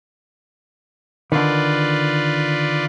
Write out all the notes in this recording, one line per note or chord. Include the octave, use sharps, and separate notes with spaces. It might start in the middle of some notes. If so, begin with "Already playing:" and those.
D3 D#3 F4 B4 D5